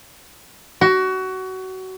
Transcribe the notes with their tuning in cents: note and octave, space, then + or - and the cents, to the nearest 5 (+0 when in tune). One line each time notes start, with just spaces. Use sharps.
F#4 +25